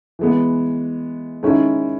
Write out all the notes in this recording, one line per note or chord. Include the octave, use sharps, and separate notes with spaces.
E3 G#3 B3
D#3 G#3 C#4 E4